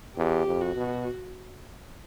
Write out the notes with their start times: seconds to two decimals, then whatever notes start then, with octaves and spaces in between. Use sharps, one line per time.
0.17 E2 G4
0.46 F2
0.61 F#4
0.76 B2